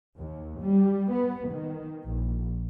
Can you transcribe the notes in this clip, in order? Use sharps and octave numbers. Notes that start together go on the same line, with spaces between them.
D#2
G3
B3
D#3
A#1